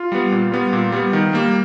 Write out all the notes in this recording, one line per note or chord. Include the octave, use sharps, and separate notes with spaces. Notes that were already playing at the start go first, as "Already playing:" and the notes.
Already playing: F4
G3 B3
A#2
G3 B3
A#2
G3 B3
D#3
G3 A#3